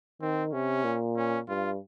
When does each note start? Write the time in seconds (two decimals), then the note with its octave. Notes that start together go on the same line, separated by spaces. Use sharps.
0.21 D#3 C4
0.53 C3 C#4
0.84 A#2
1.17 C#4
1.48 G2 F4